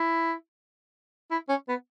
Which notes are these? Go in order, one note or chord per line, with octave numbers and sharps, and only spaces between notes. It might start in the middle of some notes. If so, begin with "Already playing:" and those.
Already playing: E4
E4
C#4
B3